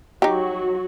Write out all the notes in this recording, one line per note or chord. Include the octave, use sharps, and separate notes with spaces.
F#3 D#4 F#4 G4